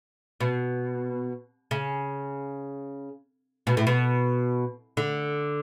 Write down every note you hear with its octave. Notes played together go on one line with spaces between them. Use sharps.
B2
C#3
B2
A2
B2
D3